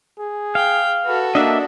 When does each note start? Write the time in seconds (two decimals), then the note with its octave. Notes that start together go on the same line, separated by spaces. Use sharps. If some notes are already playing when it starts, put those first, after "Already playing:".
0.19 G#4
0.55 F5 G5
1.06 F#4 A4 B4
1.35 A#3 D4 D#5 E5